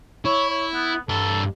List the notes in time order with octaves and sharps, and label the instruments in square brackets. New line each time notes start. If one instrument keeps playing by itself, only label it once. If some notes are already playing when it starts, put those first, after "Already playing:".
[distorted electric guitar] E4 [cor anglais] C#5
[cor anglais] C#5
B3
[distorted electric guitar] G2 C6 [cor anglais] A4